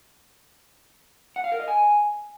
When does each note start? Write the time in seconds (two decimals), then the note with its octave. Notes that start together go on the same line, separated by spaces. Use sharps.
1.36 F#5
1.44 F5
1.52 A#4
1.60 D#5
1.68 G#5